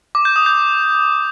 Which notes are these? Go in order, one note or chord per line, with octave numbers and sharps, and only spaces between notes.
D6
G6
D#6
G6